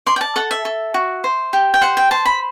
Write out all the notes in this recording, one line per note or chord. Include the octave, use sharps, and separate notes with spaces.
D5 C6
G5
A5
A4 F#5
E5
A4
F#4
C5
G4
G5
C5 F#5
G5
C5 A5
B5